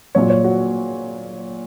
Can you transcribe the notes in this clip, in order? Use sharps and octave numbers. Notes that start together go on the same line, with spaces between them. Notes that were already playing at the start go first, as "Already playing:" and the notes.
A#2 F#3 C#5
C#5
F#4